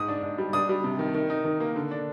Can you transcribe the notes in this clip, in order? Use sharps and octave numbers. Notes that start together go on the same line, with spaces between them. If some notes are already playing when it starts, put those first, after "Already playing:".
Already playing: G#2 D#6
D4
G#2
G3
D4 D#6
G3
C3
D#3
D#3
D#4
D#3
A#3
D3
D4